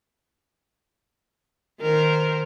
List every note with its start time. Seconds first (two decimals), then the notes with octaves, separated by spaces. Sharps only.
1.80 D#3 A#4 C5